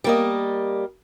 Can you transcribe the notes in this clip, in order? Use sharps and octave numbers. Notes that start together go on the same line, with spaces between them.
G3 A#3 D#5